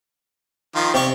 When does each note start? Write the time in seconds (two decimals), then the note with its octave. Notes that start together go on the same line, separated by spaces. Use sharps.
0.75 D#3 F3 F4
0.94 C3 G4 D5 C#6